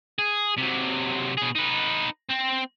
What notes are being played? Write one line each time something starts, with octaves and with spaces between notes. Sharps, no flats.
G#4
C3 F#3
B2 G#4
D#4 B4
C4